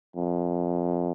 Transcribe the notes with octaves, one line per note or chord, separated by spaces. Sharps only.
F2